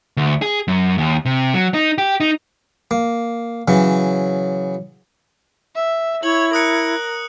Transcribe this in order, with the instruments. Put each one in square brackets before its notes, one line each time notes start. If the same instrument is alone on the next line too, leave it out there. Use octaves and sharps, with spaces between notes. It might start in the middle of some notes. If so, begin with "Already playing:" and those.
[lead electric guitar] D2
G#4
F#2
D#2
C3
F#3
D#4
G4
D#4
[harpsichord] A#3
C#3 E3 F#3
[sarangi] E5
[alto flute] E4 [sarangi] C#5 [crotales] F#7
[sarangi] A#4 [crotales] D#6 F#6 C#7